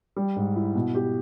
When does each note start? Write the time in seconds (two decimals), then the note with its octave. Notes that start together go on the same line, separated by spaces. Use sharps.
0.16 G3
0.36 G#2
0.56 E4
0.75 B2
0.95 G4